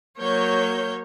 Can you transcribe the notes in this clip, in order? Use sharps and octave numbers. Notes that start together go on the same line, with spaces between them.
F#3 A#3 C#5 G6